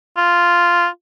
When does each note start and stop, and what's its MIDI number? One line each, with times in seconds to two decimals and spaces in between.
0.17 0.87 65